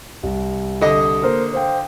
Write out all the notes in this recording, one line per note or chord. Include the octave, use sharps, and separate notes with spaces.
C2
D3 D#5 D#6
A#3 A#4 C5
C5 F5 G5